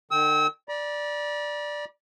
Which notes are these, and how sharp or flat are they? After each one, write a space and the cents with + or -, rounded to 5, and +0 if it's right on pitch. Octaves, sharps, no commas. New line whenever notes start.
D3 +45 G5 +0 E6 -35
D5 +0 B5 -45